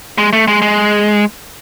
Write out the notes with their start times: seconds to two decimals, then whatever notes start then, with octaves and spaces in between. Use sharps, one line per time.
0.18 G#3
0.33 A3
0.48 G#3
0.62 G#3